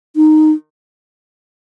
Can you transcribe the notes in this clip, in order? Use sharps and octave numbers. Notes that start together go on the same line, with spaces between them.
D#4